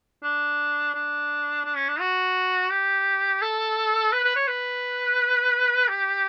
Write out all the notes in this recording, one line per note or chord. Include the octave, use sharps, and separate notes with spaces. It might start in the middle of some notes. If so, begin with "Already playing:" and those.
D4
D4
D4
C#4
D4
F#4
G4
A4
B4
B4
C#5
B4
G4